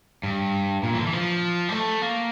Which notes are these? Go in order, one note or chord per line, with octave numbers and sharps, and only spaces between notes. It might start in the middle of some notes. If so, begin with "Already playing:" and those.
G2
A#2
E3
D3
E3
F3
G3
A3
A#3